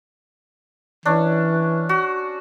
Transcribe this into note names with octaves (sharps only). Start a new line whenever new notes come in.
E3 C#4 D4
F#4